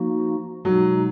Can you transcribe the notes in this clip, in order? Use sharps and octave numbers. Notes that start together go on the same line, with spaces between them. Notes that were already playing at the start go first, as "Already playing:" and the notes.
Already playing: F3 A#3 D#4 F#4
B2 F#3 G#3 D#4